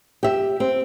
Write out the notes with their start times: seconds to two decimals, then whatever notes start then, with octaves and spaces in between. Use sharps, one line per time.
0.23 G4 E5
0.60 C4